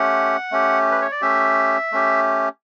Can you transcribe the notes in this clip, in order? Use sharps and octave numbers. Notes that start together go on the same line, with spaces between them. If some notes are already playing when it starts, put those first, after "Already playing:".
Already playing: A3 C#4 G4 F#5
A3 C#4 G4
B4
C#5
D5
A3 C#4 G4 E5
A3 C#4 G4